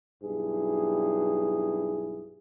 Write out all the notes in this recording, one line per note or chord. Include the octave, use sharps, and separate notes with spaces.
B1 G2 E4 G#4